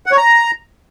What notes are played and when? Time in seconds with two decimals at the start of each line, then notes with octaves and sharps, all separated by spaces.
0.06 F#5
0.12 C#5
0.17 A#5